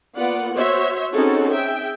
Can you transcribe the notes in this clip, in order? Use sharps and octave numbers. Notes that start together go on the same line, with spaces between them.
A#3 B3 F4 B4 D5 F#5
F#4 C5 C#5 E5
C4 C#4 D#4 F#4 G#4 A4
G#4 E5 G5